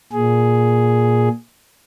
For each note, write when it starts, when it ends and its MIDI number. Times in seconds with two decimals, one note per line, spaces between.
0.13 1.29 46
0.13 1.29 68